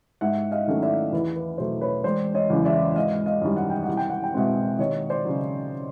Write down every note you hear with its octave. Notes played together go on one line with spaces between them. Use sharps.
G#2 E5 F#5
D#5 F5
D#3 F#3 A3 C#4
D5 E5
E2 B4
B4
B2 F#3 A3 C5
B4 C#5
E1 C5 D5
C#5 D#5
E2 C#3 F#3
D5 E5
G#1 D#5 F5
D#5 F5
F#2 D#3 G3
F#5
G5
C2 F#5
G5
F#5
G5
B2 G#3 C4 E5 F#5
D#2 C#5 D#5
C5 D5
C#3 F#3